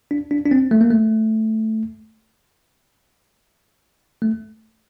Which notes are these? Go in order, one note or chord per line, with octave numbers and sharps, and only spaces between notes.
D4
D4
D4
C4
A3
A#3
A3
A3